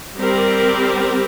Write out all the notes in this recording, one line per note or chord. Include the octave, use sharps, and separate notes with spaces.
G3 C4 G4 A#4